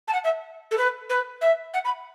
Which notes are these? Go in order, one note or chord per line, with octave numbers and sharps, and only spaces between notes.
A5
F#5
E5
A4
B4
B4
E5
F#5
B5